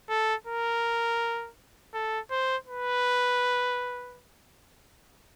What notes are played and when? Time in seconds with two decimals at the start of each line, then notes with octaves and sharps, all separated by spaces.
0.09 A4
0.47 A#4
1.94 A4
2.31 C5
2.67 B4